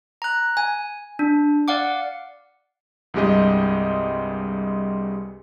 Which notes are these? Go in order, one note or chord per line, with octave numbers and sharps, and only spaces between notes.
A#5 F#6
G#5
D4
D5 F5 F#5 D6
C2 G2 G3 G#3 G4 D#5